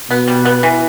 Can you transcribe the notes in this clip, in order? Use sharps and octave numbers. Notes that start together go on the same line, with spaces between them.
B2 B3
G3
B3
E3